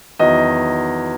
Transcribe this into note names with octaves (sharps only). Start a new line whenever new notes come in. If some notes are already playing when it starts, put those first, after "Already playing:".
E2 D#3 F#3 D#5